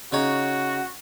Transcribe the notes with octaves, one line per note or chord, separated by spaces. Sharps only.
C#3 D#4 F#4 C#5